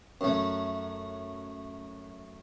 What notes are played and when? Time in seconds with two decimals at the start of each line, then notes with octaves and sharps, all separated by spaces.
0.21 F#2 A3